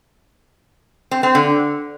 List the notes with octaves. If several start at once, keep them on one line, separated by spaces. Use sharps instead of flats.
C4
C4
D3